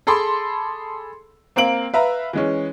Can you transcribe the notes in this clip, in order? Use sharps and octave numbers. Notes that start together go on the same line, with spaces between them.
G#4 A4 A5 B5 C6 D6
A#3 C4 F5 D7 F#7
B4 E5 F5 A#5
E3 G#3 C#4